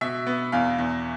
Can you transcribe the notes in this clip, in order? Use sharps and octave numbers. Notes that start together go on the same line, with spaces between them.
B2 E5
B3
E2 F5
E2